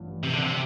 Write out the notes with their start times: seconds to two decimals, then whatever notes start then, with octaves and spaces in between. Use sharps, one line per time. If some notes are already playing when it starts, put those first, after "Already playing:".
Already playing: A1 G2 F3
0.23 C3
0.33 D3
0.42 C3